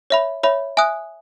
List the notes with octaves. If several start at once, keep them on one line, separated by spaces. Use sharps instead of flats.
C#5 E5 B5
C#5 E5 B5
E5 G#5 D#6 F#6